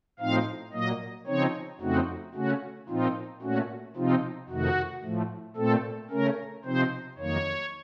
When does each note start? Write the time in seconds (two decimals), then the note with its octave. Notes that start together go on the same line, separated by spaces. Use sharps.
0.19 A2 F3 C4 D#4 F5
0.73 A#2 F#3 A#3 D#5
1.27 C#3 F3 C4 D#4 C#5
1.81 F2 C#3 A3 C4 D#4 F#4
2.34 C#3 A3 C#4 F#4
2.89 A#2 F3 C4 D#4 F4
3.42 A#2 A3 C#4 F#4
3.96 C3 F3 C4 D#4 F4
4.49 F2 C3 D#3 A3 D#4 F#4
5.04 A2 F3 A3
5.56 A#2 A3 C4 A4
6.10 C#3 A3 C#4 A#4
6.65 C3 F3 C4 D#4 C5
7.18 F2 D#3 F#3 A#3 D#4 C#5